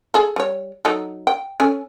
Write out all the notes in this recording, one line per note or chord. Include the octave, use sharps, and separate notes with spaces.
G#4 A4
G3 C#5
F#3 D#4 A4
G5
C#4 A4 G#5